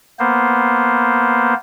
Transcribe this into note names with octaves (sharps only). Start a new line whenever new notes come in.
A#3 B3 C5